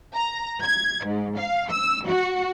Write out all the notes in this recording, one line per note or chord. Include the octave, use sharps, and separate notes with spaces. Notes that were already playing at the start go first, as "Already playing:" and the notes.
A#5
G#6
G#2
F5
E6
F#4